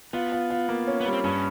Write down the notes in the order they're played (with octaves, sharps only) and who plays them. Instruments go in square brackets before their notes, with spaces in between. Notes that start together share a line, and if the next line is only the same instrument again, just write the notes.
[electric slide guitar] B3 [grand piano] F4
[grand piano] F4
F4
A#3
C#4
[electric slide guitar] B3
[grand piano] G3
[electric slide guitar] C4
[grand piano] G2 [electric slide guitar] C#4